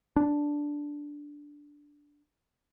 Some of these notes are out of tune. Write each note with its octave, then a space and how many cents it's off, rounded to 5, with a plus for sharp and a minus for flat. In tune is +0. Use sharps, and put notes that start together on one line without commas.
D4 -5